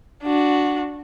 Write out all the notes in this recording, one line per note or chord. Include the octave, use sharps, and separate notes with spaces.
D4 F#4